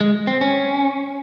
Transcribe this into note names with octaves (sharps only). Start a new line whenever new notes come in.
G#3
C4
C#4